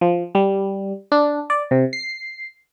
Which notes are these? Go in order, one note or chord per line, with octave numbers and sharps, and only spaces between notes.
F3
G3
D4
D5
C3
C7